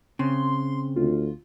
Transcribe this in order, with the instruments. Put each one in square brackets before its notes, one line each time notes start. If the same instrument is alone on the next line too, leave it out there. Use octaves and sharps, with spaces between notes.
[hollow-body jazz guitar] C#3 [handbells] C4 [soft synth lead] C6
[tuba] D2 [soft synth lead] F4